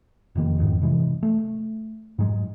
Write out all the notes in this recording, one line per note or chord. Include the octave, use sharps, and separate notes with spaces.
F1 D#3 A#3
G#1 F2 G#2 D#3
C3 E3 G#3
A3
G#2 F#3 G#3